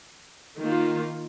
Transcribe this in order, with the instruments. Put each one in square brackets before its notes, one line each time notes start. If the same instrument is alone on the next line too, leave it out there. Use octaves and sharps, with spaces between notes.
[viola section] D#3 A#3 F4